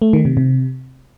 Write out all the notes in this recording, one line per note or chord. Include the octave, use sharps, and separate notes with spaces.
A3
D#3
C3
C3